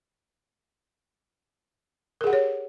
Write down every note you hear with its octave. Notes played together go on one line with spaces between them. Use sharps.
G4 G#4 A#4 C#5 F#5